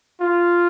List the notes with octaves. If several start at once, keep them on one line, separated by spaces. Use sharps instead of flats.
F4